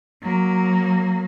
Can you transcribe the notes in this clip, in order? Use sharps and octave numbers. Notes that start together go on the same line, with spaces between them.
F#3 A#3